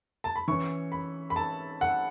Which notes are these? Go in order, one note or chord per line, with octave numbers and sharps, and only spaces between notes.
A5
B5
E3 C#4 C#6
B5
B5
A5
F#5